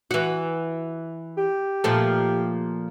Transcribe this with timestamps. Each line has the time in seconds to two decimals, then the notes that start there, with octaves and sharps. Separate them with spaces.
0.11 E3 F#4
1.37 G4
1.84 A#2 F3 A3